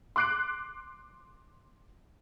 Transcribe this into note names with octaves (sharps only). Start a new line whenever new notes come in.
C6 D6 F#6 C7 D7